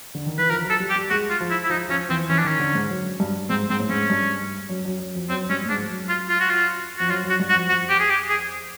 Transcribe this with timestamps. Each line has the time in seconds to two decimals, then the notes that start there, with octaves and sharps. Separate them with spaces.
0.15 D3
0.26 D#3
0.38 E3 B4
0.50 F3 A#4
0.64 F#3
0.70 A4
0.80 G3
0.90 G4
0.96 G3
1.10 G#3 F#4
1.30 F4
1.40 F3
1.50 E4
1.63 E4
1.70 F3 D#4
1.89 F3 C#4
2.10 E3 C4
2.29 E3 C#4
2.39 D4
2.45 D#3 C#4
2.60 D3
2.75 G#2
2.90 F#2
3.20 G2
3.50 G#2 C4
3.70 G#2 C4
3.80 A2
3.89 G#2 C#4
4.10 G2
4.69 F#2
4.85 F#2
5.00 F#2
5.15 F2
5.29 F#2 C4
5.50 G2 C#4
5.65 A2
5.69 G#2 D4
5.90 F#2
6.09 F4
6.30 F4
6.40 F#4
6.49 F4
6.98 F2 F#4
7.09 F#2 F4
7.24 F#2
7.30 F#4
7.40 G2
7.50 F#4
7.54 F2
7.69 F2 F#4
7.89 G4
8.00 G#4
8.10 G4
8.29 G#4